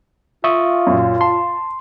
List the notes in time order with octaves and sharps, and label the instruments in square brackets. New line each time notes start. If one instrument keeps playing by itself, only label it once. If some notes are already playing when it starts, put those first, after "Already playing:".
[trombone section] F4 [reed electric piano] E5 C#6 D#6
[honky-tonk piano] F#2 A#2
[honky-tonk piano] A5 [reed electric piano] C6